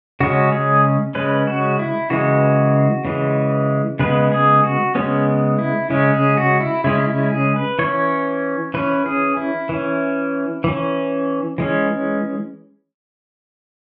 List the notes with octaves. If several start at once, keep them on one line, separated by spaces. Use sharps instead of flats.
C#3 G#3 C#4 F#4
G#4
C#3 G#3 C#4 B4
F#4
E4
C#3 E3 G#3 F#4
C#3 E3 G#3
C#3 G#3 B3 B4
G#4
F#4
C#3 G#3 B3 C#4
E4
C#3 G#3 C#4
G#4
F#4
E4
C#3 G#3 C#4 E4
E4
G#4
B4
E3 C#4 C#5
E3 C#4 B4
G#4
E4
E3 C#4
E3 C#4
E3 G#3 C#4